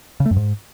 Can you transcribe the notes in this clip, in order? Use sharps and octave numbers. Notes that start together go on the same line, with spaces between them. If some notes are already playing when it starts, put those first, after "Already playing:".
C#3
A3
F#2
G#2